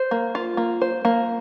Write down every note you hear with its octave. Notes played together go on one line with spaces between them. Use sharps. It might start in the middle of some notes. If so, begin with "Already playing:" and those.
Already playing: C5
A#3
F4
A#3
C5
A#3